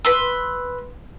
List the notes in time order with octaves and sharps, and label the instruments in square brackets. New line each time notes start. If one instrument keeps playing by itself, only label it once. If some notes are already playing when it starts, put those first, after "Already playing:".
[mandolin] B4 C6 E6